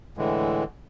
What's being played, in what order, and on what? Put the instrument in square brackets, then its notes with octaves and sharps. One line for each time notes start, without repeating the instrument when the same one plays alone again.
[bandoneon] A2 D3 E3 G#3